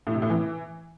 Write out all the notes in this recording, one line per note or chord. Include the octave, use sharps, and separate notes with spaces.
A2
C3
A2
E3